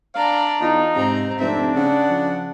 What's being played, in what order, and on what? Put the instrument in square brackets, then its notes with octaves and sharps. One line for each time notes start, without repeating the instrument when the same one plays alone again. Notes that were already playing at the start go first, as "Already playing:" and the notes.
[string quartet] D4 D5 A#5 [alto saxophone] F5
[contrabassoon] E2 [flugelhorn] D#4 [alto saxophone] F4
[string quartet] G#2 C4 A#5 [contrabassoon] C3
[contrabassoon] F1 [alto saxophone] C4 [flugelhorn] D4 [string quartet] E5
[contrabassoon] C#3 [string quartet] F#5
[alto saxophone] F3